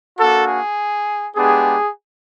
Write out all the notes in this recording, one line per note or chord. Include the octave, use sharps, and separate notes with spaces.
A#3 D4 F#4 A4
G#4
G#3 B3 D4 G4 G#4